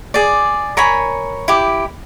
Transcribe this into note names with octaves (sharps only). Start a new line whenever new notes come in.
G#4 D5
A#4 C#5 G#5 B5
E4 G4 D6